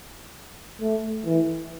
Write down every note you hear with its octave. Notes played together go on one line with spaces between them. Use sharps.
A3
E3